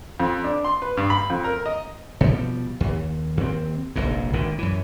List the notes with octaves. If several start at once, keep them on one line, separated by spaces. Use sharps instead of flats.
F2
D4
C6
B4
G2
B5
F2
A#4
D#5
B2 F3 G3
D#2
D#2 C4
F1 A#1 G#2
G#1 A2 D3
F#2 E3